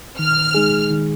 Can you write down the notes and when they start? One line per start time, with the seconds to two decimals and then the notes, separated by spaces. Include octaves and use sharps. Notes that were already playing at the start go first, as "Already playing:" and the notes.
0.19 D#3 F6
0.54 G#3 D#4 G#4
0.90 D#3